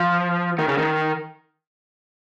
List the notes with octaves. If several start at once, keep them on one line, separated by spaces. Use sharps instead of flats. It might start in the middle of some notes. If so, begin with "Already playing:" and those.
Already playing: F3
D#3
C#3
D#3